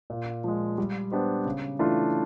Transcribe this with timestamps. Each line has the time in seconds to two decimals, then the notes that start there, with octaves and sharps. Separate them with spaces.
0.10 A#2
0.44 F3 G#3
0.78 G3
1.11 B3 D4 G4 C5
1.45 C#3
1.79 E3 A3 D4 F4